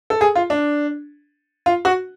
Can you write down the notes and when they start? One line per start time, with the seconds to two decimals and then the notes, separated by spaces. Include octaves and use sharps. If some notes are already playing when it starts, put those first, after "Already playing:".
0.10 A4
0.21 G#4
0.35 F4
0.50 D4
1.66 F4
1.85 F#4